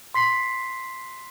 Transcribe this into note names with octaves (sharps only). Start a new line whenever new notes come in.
C6 B6 C7